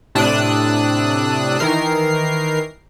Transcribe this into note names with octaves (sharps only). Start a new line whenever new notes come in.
A2 C3 D4 D#6 E6 F#6
D#3 E3 A#4 C7